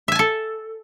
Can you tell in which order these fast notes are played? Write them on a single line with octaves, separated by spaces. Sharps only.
E5 G#5 A5 A4